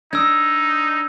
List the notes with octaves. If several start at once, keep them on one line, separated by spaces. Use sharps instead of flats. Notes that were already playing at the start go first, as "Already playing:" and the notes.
D4 D#4 D#6 E6 G#6